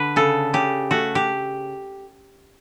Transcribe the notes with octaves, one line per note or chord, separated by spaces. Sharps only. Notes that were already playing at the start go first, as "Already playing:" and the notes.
Already playing: D3 B4
C#3 A4
C#3 G4
A3 F#4
G4